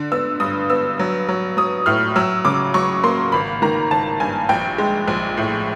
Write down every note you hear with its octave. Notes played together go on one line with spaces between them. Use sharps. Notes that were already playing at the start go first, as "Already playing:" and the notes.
Already playing: D3
B3 E6
G2 D#6
B3 E6
F#3
F#3
F#3 D#6
A2 F6
F#3 E6
C#3 D6
F#3 C#6
A#3 C6
G#1 B5
D#3 A#5
G#1 A5
G2 G#5
A#1 G5
G#3
A#1
A2